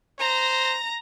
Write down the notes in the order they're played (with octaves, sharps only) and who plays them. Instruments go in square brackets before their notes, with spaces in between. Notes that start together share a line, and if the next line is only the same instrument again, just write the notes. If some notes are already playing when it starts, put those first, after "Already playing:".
[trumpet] C5 [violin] A#5 A#6